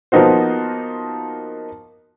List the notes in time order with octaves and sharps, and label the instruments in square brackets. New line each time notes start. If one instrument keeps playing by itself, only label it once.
[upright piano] F3 A#3 B3 D#4 F#4 C5